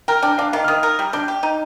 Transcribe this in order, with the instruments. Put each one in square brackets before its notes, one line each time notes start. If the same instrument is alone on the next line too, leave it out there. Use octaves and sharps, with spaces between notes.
[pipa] A#4 [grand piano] G5
[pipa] D4 [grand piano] G5
[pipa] D4 [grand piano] F5
[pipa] D#3 [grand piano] F5
[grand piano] F6
[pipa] D#3 [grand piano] D#6
[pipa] A#4
G3
[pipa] D4 [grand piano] G6
[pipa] G4
D#4